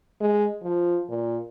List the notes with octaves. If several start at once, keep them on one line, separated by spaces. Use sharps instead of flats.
G#3
F3
A#2